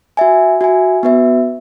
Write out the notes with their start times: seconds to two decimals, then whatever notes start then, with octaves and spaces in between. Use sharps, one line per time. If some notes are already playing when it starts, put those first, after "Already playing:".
0.17 F#4 E5 G#5
0.61 F#4 E5 G#5
1.03 B3 F#4 B4 E5